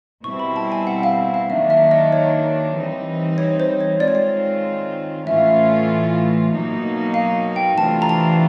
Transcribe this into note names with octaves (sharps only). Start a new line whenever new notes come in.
B2 G3 C4 E4 C#6
B5
A5
G#5
F#5
F5
F5
D#3 F#3 A#3 D4 E5
E5
D#5
C#5
E3 G3 C4 D#4
C#5
C5
C#5
D#3 G#3 C4 F4 D5
C#5
D5
A2 E3 A3 C#4 F4 E5
F5
E5
B2 F#3 A#3 D#4
F5
G5
C3 E3 A3 D4 F4 A5
A#5
A5